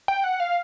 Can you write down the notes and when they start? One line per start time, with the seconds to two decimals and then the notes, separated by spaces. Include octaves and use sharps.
0.08 G5
0.24 F#5
0.40 F5